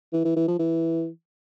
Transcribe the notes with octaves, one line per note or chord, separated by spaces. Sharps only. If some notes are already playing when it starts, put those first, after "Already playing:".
E3
E3
E3
F3
E3